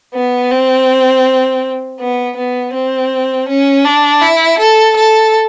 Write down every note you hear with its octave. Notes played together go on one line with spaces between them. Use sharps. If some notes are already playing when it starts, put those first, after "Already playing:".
B3
C4
B3
B3
C4
C#4
D4
E4
A4
A4